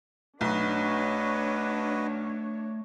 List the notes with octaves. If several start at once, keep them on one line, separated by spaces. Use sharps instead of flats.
B1 A3 D4 F#4 B4 C#5 D#5